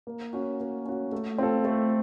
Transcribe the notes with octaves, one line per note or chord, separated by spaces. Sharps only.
A#3
C#4 F#4
A#3
C#4 F#4
A3
C4 F4 A4
A3